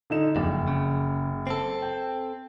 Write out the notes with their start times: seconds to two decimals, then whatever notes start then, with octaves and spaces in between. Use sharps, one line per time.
0.10 D3 D#4 E7
0.36 F#1 F2
0.68 C#3
1.47 C4 A4
1.82 G5